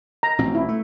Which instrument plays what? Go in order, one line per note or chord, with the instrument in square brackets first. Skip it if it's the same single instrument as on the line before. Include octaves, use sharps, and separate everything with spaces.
[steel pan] A#5
[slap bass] A1 B2 C4
[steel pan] E4
[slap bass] A3